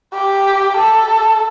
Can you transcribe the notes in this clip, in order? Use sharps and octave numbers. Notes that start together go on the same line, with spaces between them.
G4
A4